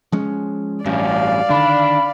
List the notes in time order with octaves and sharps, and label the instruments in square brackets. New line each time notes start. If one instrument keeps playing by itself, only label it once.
[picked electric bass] F3 G#3 C#4
[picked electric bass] A1 [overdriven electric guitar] G2 C#4 [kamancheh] D5 F5
[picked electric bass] D3 D#3 [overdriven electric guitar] D4 [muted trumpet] B5